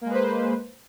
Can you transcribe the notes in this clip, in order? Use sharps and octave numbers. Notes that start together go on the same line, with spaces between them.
G#3 A#3 B4 C5